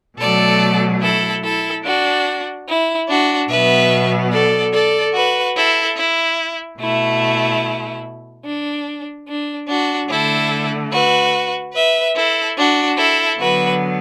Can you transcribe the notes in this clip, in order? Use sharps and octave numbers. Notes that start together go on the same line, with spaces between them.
B2 F#3 A3 A4 D5
E4 A4
E4 A4
D4 F#4
E4
D4 F#4
B2 F#3 B3 B4 E5
A4 D5
A4 D5
F#4 B4
E4 A4
E4
B2 A3 E4
D4
D4
D4 F#4
D3 A3 E4 A4
F#4 B4
B4 E5
E4 A4
D4 F#4
E4 A4
D3 F#3 B3 F#4 B4